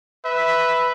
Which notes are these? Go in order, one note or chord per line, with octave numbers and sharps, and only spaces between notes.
B4 E5